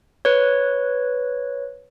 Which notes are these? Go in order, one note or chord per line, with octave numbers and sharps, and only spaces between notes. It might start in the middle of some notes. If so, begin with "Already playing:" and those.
B4 C#5